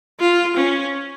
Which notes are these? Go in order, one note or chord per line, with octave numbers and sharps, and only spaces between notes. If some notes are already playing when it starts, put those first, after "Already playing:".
F4
C#4